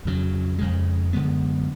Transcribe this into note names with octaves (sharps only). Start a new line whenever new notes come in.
F2 C#3 F#3
F2 C#3 G#3
F#2 D3 G#3 B3